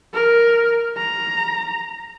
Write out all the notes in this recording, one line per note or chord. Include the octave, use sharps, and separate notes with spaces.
A#4
A#5